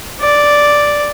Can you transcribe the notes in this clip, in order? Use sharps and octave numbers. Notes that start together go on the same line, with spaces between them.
D5